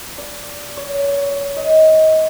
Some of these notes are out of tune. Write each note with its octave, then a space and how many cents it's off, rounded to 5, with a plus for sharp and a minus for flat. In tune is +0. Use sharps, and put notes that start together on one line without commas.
D5 -10
C#5 +25
D#5 +25